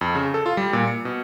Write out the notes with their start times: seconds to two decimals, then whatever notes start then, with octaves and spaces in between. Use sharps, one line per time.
0.01 F2
0.15 C#3
0.34 A4
0.46 F4
0.57 G3
0.73 A#2
0.87 C#7
1.05 B2